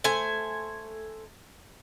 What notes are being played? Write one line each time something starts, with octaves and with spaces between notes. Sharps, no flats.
A3 C5 G#5